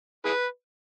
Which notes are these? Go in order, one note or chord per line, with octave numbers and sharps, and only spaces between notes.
E4 G#4 B4